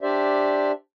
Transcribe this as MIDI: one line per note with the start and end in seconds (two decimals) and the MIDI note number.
0.01 0.72 62
0.01 0.72 67
0.01 0.72 72
0.01 0.72 74
0.01 0.72 76